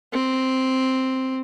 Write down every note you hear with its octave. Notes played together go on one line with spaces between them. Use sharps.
C4